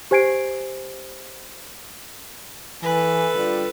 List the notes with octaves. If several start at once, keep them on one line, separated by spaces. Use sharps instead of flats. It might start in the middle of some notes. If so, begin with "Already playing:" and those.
G4 C5 G#5 G#6 C7 D7
E3 A4 B4 G#5
D3 G3 F4